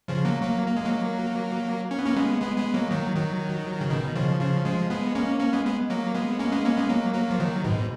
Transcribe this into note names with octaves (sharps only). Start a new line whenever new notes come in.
C#3 F3
F#3 A#3
F#3 A#3
A#3
G#3
F#3 A#3
C#4
B3
A#3 C#4
G#3 B3
G#3 B3
G#3 B3
F#3 A#3
D#3 F#3
D#3 F#3
C#3
B2 D#3
C#3 F3
C#3 F3
F3 G#3
G#3 B3
A#3 C#4
A#3 C#4
G#3 B3
G#3 B3
F#3 A#3
G#3 B3
A#3 C#4
G#3 B3
A#3 C#4
G#3 B3
F#3 A#3
F#3 A#3
F3
D#3 F#3
G#2 B2